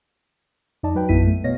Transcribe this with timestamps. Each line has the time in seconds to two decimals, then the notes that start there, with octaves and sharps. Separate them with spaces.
0.83 F2 D#4 D5 D#5 A5
0.95 F#3 B4 G5
1.09 A#1 F#2 B3 E4 B6 D#7
1.26 A3
1.44 B2 B3 C#5 D#5 F5 A#6